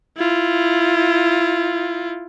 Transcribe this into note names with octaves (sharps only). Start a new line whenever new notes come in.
E4 F4